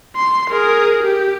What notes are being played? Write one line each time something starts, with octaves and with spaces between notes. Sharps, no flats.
C6
G#4 A#4
G4